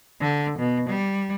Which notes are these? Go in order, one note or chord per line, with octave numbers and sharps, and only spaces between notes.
D3
B2
G3